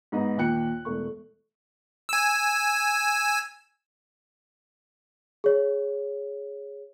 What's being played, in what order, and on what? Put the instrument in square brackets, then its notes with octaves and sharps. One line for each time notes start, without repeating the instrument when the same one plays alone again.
[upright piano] G#2 B3 D#5
D#2 A#2 G5 F#6 C#7
E1 A3 C#6
[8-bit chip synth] G#5 E6
[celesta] G#4 C#5